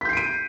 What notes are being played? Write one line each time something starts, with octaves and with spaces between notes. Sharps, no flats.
G6 B6 C7 D7 D#7